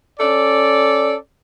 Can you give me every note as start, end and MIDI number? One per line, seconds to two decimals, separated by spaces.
0.20 1.16 61
0.20 1.16 69
0.20 1.16 74